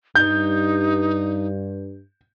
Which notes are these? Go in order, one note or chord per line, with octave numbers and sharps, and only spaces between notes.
G2 D#4 G6